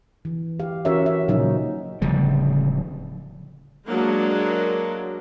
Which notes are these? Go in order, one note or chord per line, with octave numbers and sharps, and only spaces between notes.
E3
G4 F5
E3 C#4 F#4 A#4 C#5 E5
E5
A#2 C#3 F3 F#3 C#4 D#4
D1 C#3 F3 G3
F#3 G#3 A#3 D4